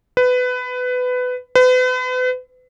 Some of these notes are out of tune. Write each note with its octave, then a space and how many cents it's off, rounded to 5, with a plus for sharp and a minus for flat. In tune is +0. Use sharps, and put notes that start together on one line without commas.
B4 +20
B4 +40